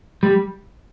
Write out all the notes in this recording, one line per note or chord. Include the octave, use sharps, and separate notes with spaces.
G3